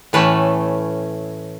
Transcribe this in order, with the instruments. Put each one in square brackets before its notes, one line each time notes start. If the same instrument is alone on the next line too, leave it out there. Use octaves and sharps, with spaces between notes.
[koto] A2 E3 A3 C#4 A4 B4